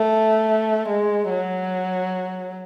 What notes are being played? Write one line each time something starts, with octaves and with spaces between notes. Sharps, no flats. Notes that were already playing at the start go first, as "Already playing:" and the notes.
Already playing: A3
G#3
F#3